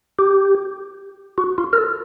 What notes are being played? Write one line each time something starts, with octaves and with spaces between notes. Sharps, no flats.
G4
F#4
F4
A#4
A4